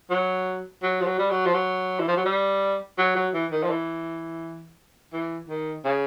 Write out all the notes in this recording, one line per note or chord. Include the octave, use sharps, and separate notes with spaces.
F#3
F#3
F3
F#3
G3
F#3
F3
F#3
E3
F3
F#3
G3
F#3
F#3
E3
D#3
F3
E3
E3
D#3
C#3